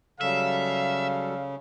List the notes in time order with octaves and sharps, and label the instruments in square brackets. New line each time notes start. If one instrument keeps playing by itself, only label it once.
[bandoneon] C#3 [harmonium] F#3 G3 A4 [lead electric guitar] E5 [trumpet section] F5